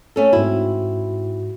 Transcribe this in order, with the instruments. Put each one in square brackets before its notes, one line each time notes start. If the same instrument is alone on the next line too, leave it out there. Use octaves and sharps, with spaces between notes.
[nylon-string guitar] A3 C#4 A4
[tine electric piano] G#2 F#4 [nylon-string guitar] C4 E4